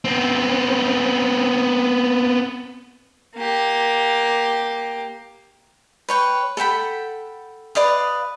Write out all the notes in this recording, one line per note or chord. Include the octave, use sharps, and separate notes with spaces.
B3 C4
A#3 G4
B4 C#5 G5
A4 F#5 G5 B5
B4 D5 F5 D#6